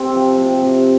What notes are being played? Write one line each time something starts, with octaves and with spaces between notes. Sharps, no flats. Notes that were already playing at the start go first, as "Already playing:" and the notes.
Already playing: C3 C4
F3
C3
C3